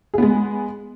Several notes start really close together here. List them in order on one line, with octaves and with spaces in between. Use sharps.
G#4 B3 G#3